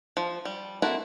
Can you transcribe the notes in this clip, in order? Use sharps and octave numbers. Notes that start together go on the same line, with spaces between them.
F3
G3
A#3 C4 E4 F#4 A4